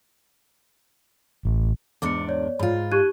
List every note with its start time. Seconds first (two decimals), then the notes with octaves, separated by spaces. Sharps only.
1.45 A1
2.02 E2 G#2 D4 D6 C#7
2.29 C#5 D5
2.59 G#2 F4 B5
2.91 D#4 G4 C#6 F#6 G#6 D#7